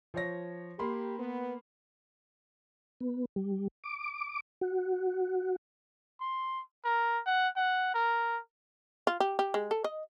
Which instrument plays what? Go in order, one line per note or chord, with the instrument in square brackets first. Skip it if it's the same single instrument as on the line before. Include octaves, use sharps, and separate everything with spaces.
[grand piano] F3 C#5 A#6
[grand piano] A#3 B5 C6 [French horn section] G4
[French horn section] B3
[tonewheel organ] B3
G3
D6
F#4
[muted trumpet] C6
A#4
F#5
F#5
A#4
[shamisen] F4
G4
G4
G#3
A4
D#5